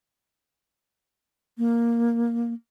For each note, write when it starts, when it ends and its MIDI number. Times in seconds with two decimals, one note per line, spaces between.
1.58 2.53 58